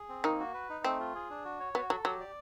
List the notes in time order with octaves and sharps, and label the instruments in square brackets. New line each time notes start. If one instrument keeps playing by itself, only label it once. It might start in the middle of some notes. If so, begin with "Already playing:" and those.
Already playing: [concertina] G#4
C4
[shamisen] D#3 D#4 [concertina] A#3
[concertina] F#4
B4
D#4
[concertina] A3 [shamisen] C4
[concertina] F4
G#4
D4
F#4
C#5
[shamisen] B3 [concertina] F#4
[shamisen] F#3 [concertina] A4
[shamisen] F#3 [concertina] G4
[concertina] D5